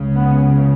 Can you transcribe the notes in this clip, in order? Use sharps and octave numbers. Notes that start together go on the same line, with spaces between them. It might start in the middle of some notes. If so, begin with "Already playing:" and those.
Already playing: C#2 C#3
B3